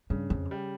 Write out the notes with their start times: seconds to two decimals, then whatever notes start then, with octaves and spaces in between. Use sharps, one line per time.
0.10 G2 C#3
0.30 F2
0.51 G3